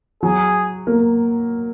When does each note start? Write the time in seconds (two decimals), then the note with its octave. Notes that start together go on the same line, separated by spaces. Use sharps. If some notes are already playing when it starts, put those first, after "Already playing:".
0.23 F#3 G#4
0.87 A#3